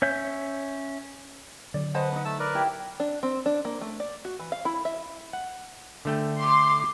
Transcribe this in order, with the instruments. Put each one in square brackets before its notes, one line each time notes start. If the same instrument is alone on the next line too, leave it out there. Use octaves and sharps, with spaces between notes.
[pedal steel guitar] C#4 C#5 E5 G6
[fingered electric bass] D3 F#3 [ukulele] D5
[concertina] B4 F#5 [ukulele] C5 D#5 A5
[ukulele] D4 D#4
[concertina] A3 A5 E6
A#4 B4 D5
[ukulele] E4 G4
[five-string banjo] D4
C4
D4
A#3
A3
D5
F#4
E3
F5
E4
E5
[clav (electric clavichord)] F#5
D3 A3 G5
[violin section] C6 [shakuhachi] D6